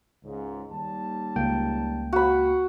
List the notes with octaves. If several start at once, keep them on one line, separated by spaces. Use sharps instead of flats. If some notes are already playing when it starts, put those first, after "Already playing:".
C#2 G#2 C#3
D#2 G3 A5
C#2 A#3 G5
F#4 B5